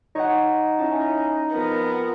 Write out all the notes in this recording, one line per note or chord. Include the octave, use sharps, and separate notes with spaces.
D#4 C#5 D#5 F#5
C#4 E4 A5
F2 F3 B3 A#4